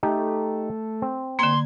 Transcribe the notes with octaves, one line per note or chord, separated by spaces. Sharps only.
A3 D#4 G4
C4
D3 A#3 C6 G#6